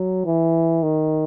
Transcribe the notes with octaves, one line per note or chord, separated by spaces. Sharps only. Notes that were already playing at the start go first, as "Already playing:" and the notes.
Already playing: F#3
E3
D#3